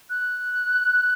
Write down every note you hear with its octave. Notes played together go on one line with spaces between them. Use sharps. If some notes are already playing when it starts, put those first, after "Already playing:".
F#6